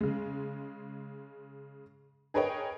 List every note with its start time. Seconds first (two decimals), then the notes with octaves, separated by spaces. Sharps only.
0.01 C#3 G#3
2.34 G#4 A#4 B4 C#5 D#5 G5